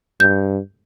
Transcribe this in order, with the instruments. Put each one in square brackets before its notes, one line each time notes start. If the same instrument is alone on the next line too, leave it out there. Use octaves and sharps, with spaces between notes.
[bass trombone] G2 [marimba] G6